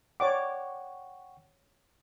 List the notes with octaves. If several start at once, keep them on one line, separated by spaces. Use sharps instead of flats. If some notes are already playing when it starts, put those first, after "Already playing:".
C#5 D5 F#5 G5 C#6 D6